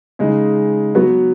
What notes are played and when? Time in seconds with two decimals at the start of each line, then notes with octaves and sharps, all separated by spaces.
0.19 C#3 G#3 D#4
0.95 F#3 B3 F#4 B4